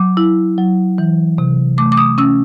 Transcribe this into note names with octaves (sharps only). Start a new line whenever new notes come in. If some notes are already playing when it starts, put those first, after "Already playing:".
Already playing: F#3 D6
E4
F#3
E3
C3
A3 D6
D6
D#6
C#4 E6